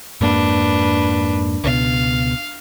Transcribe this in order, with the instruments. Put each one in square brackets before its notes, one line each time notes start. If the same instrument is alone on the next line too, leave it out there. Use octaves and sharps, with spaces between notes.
[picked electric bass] F2 G#2 A#3 [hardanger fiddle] D4 B4
[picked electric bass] C#2 B2 [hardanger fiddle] F5